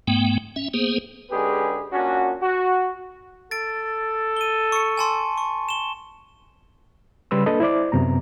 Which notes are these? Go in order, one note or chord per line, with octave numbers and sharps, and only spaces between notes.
G#2 A3 B3 G5
C#4 E5
A#3 B3 G#4 C5
D3 G#3 C#4 G4 G#4 B4
A#2 C#4 D4 F#4
F#4
A4 A6 D7
D#7 G7
C#6 C#7
G#5 A5 C6
C#6
E7 G7
C#3 G3 B4 C6 E6
A#3 D4 A4 B4 D#5
E4 C5 D5 D6
F#2 C3 B3 A#5